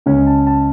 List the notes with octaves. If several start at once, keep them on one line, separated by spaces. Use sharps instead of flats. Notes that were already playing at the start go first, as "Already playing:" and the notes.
C#2 C#3 G#3 C#4
A5
A5